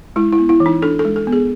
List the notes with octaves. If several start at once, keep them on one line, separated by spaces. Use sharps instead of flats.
G#3 E4
E4
B3
E4
E3
D#4
D4 A4
A4
G#3
A4
B3
G#4